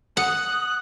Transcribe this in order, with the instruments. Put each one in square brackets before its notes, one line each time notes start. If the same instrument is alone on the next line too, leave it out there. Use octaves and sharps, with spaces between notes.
[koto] F#5 [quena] D#6 [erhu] F#6